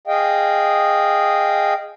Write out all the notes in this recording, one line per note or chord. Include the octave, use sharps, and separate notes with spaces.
G#4 D#5 F5 G5